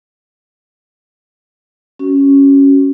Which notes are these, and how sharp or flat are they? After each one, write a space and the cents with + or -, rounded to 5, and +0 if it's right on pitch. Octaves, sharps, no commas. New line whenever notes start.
C#4 +0 F#4 +25